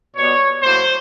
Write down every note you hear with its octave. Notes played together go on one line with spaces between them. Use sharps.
B2 G3 B3 C#5
A2 F#3 A#3 C5